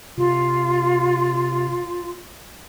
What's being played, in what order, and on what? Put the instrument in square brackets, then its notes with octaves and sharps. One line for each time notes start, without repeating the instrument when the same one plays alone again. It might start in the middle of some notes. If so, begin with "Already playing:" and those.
[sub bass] C3 [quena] F4